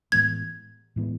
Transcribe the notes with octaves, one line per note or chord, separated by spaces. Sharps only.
A2 E3 G#3 B3 G#6
A2 E3 G#3 B3